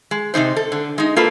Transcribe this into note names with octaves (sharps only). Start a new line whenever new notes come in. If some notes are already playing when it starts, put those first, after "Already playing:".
G#3
C3 D#3 D#4 C5
A4
D3
G#3 D#4
A#3 F4 A4 B4